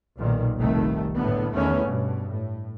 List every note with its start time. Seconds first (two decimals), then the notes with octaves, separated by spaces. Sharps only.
0.16 B1 A#2 D#3
0.57 F1 C2 D#3 A3
1.16 F#1 A2 D3 B3
1.54 E2 D#3 A3 B3 C#4
1.86 G2 B2
2.30 A2